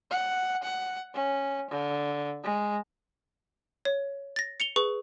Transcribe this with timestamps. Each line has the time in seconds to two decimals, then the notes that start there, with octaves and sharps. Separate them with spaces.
0.11 F#5
0.63 F#5
1.14 C#4
1.70 D3
2.44 G#3
3.85 C#5
4.36 A6 A#6
4.60 C#7 F7 G7
4.76 G#4 B4 C#6